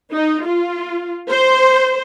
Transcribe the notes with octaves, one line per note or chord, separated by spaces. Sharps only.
D#4
F4
C5